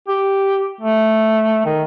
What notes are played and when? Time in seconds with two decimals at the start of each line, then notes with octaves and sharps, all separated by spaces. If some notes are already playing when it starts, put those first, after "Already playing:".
0.08 G4
0.81 A3
1.66 D#3